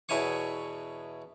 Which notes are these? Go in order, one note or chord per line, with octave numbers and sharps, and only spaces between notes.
E2 B2 E4 C#5 G#5 C#6